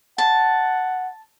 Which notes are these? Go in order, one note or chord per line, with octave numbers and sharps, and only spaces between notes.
F#5 A5